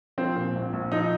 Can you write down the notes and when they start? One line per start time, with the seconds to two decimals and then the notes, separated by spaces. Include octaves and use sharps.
0.18 F3 C4
0.36 A#2
0.55 A#1
0.73 A#1
0.92 F3 D#4